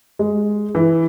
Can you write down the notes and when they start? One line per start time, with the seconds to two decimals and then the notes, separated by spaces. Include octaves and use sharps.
0.19 G#3
0.75 E3